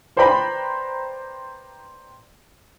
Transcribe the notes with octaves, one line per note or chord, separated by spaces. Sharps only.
B4 C5 D5 G5 A#5 B5